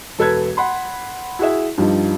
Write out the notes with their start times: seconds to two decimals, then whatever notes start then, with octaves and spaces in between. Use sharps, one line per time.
0.19 E1 A4 B4 G#6
0.57 F#5 B5 C6
1.39 E4 F#4 G#4 E5
1.78 G2 F3 G3 D#4